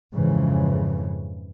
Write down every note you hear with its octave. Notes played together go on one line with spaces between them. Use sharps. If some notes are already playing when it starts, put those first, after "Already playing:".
F2 G#2 C#3 E3